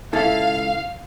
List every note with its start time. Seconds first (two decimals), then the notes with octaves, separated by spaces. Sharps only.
0.13 C#2 E4 A4 F5